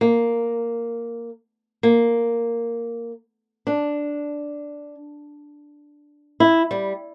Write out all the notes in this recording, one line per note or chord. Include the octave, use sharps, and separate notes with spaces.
A#3
A#3
D4
E4
G3